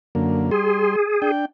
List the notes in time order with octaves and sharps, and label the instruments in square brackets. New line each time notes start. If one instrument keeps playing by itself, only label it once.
[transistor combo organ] F#2 D3 A#3
[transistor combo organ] G3 C6 [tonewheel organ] G#4
[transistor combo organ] D4 G5